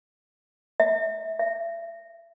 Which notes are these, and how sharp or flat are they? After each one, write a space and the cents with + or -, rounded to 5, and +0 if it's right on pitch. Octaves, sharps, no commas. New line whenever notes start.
E5 -25
E5 +35